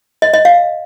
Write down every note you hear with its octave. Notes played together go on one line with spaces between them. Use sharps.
D#5
D#5
F5